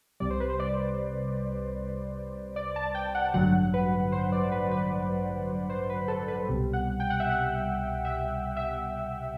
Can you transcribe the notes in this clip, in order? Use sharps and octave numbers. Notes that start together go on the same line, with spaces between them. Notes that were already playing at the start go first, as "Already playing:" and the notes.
C2 C3 G3 D5
C5
B4
C5
D5
D5
A5
G5
F#5
A1 G2 D3 F#3 F#5
B4
C5
D5
B4
B4
C5
B4
A4
B4
C2 B2 G3
F#5
G5
F#5
E5
F#5
E5
E5